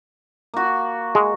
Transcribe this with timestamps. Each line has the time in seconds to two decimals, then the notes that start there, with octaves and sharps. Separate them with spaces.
0.54 A#3 F#4
1.15 G#3